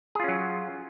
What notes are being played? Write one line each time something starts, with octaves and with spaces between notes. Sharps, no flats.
F#3 C#4 F4 G#4